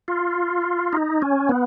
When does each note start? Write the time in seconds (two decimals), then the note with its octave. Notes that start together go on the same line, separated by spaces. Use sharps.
0.08 F4
0.93 D#4
1.22 C#4
1.49 B3